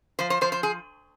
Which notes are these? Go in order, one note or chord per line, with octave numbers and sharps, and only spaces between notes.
F3 C5
C5
F3 C5
C5
G#4